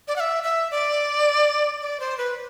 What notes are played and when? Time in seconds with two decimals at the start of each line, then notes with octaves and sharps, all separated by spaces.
0.08 D5
0.16 F#5
0.20 E5
0.43 E5
0.71 D5
1.81 D5
2.00 C5
2.18 B4